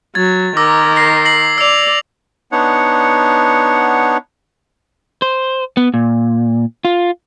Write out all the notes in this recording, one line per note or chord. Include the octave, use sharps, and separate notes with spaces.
F#3 G#6 A6
D#3 A#4 D6 E6 A#6
A#6 C7
A#6 C7 F#7
D5 E6 F7
B3 D4 D#4 C#5 F#5
C5
B3
A#2
F4